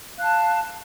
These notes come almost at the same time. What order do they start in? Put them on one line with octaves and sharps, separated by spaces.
F5 F#6 A5